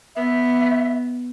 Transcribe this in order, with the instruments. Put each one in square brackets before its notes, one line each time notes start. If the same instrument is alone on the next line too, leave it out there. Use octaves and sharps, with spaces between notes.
[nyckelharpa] B3 [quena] E5